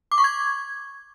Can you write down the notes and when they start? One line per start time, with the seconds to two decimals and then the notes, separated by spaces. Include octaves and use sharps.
0.12 D6
0.18 C#6
0.24 G#6